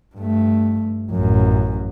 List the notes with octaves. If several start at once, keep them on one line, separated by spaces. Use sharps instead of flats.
G2 A3
A1 F#2